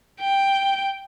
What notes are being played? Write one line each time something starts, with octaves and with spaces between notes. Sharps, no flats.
G5